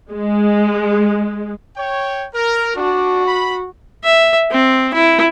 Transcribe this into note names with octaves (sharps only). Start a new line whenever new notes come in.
G#3
C#5 G5
A#4
D4 F#4
B5
E5
C4
E4